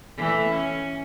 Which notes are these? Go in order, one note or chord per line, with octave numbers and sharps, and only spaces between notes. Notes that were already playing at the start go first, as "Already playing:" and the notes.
E3 A3
C#4